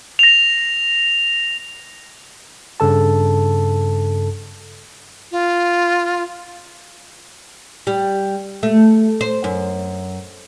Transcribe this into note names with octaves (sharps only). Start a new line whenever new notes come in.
A#6 F7
G2 C#3 A4 A5
F4
G3
A3
C5
F#2